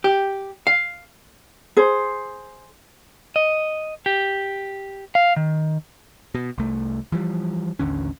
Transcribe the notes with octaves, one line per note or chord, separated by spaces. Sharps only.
G4
F5
G#4 C5
D#5
G4
F5
D#3
B2
C2 A3
E3 F3 G3
A1 D#2 D3 C#4